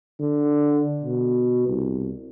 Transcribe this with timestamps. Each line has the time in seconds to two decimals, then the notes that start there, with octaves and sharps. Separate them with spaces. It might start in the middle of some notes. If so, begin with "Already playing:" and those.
0.20 D3
1.03 B2
1.67 C2